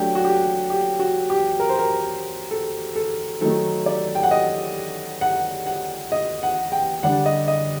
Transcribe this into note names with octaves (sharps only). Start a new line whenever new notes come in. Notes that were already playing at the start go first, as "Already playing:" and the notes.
Already playing: F#3 A3 D4 G4
F#4
G4
G4
F#4
G4
A#4
C5
A#4
A4
A4
D#3 F#3 A3 D#4 A4
D5
G5
F#5
D#5
F#5
F#5
D#5
F#5
G5
D3 G3 D4 F#5
D#5
D#5